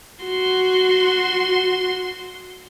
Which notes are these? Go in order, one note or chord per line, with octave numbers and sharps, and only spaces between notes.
F#4 C6